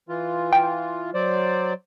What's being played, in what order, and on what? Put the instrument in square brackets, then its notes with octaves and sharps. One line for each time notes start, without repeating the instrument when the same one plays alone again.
[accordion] E3 F4
[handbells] G5
[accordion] F#3 C5 D5